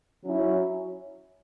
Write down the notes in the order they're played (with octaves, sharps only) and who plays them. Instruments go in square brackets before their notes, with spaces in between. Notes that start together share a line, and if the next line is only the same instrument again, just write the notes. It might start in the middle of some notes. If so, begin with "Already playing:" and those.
[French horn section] F#3 C#4 E4